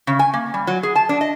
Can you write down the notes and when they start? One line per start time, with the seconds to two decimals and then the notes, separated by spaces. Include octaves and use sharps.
0.07 C#3
0.19 G#5
0.34 A#3
0.54 G3
0.67 F#3
0.83 G#4
0.96 A5
1.09 D4
1.21 D#5